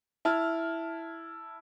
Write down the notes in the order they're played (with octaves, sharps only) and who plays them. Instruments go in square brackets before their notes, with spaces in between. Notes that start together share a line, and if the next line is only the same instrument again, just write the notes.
[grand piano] E4 A5 F6